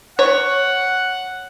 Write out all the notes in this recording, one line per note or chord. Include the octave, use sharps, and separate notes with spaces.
C#5 F#5